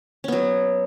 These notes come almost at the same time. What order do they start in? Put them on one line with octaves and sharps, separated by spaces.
C#4 B3 F#3